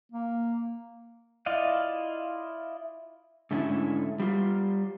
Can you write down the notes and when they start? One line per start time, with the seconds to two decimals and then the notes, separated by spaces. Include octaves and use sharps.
0.12 A#3
1.46 E4 F4 D5 D#5 F5
3.51 G#2 D3 A3 B3 C#4 E4
4.20 G3 F4